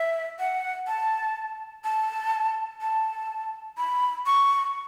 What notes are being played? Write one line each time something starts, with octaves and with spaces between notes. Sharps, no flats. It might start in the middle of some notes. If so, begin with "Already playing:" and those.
Already playing: E5
F#5
A5
A5
A5
B5
C#6